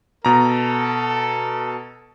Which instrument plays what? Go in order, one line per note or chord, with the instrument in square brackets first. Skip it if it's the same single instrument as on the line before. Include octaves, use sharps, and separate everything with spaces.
[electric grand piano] B2 A#5 [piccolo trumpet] A4